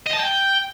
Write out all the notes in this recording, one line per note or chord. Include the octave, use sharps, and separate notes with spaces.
D#5
A5
G5